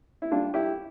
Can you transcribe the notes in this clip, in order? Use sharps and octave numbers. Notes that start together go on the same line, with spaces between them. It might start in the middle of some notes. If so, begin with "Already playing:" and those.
E4
G3 D4 F4
E4 G4